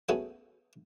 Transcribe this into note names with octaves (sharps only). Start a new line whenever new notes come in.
A3 B3 C#4 F#4 G#4 A4